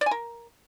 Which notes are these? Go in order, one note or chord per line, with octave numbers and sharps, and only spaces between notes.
D5
G#5
A#4